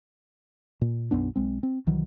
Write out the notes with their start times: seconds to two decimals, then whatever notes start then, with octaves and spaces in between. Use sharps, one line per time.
0.81 A#2
1.11 B1 F#2 B3 D4
1.36 B1 G#3 C4
1.63 C4
1.87 C2 D#3 E3 F#3